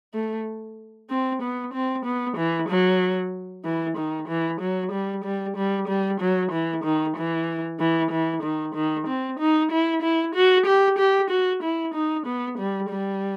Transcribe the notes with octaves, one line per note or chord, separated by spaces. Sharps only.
A3
C4
B3
C4
B3
E3
F#3
E3
D#3
E3
F#3
G3
G3
G3
G3
F#3
E3
D#3
E3
E3
E3
D#3
D#3
C4
D#4
E4
E4
F#4
G4
G4
F#4
E4
D#4
B3
G3
G3